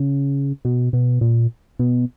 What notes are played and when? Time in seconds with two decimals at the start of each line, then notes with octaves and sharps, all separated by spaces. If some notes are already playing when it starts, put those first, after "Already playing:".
Already playing: C#3
0.65 B2
0.93 B2
1.21 A#2
1.79 B2